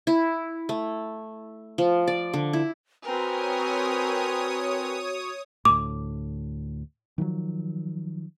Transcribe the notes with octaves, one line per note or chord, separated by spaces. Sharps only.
E4
A3
F3
D5
D3
E4
C4 F#4 A#4 B4 C#5 G5 G#5 D#6
D2 A2 D6
D#3 F3 F#3